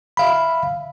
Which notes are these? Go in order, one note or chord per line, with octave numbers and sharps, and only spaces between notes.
E5 F5 B5